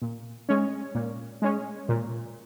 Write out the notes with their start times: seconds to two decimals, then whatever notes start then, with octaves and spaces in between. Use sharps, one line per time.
0.02 A#2
0.49 G#3 C#4
0.95 A#2
1.42 G#3 C#4
1.89 A#2